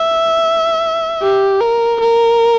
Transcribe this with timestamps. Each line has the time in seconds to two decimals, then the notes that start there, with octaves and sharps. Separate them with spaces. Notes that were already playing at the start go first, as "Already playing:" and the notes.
Already playing: E5
1.22 G4
1.61 A#4
2.01 A#4